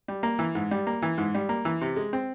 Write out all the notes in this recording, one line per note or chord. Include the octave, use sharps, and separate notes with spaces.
G3
A#3
E3
G#2
G3
A#3
E3
G#2
G3
A#3
E3
C3
G#3
C4